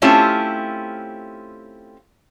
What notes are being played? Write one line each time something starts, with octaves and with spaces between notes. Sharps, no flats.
A3 C4 C#4 E4 F4 G4